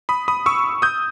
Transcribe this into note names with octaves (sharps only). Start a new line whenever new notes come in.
B5 D#6
B5 D#6
C#6 E6
D#6 G6